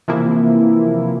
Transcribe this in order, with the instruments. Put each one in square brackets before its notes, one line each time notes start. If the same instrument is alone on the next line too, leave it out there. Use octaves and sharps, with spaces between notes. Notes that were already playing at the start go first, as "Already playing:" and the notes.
[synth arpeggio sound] C3 E3 F3 A#3 E4